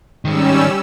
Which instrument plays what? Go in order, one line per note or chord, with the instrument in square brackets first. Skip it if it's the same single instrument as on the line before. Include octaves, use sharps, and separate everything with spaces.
[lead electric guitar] G#2 D#3 [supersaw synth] G3 C#4 E6